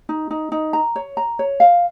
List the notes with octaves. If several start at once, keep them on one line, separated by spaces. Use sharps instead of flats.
D#4
D#4
D#4
A#5
C#5
A#5
C#5
F5